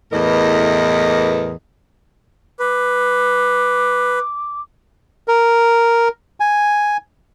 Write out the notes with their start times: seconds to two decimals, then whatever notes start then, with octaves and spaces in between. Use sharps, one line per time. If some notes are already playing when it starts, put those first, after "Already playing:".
0.11 E2 A2 E3 A4 A#4 D#5
2.60 B4 D6
5.28 A#4
6.40 G#5